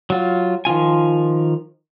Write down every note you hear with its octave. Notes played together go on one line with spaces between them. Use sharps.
F#3 F4
D#3 F3 F4 G#5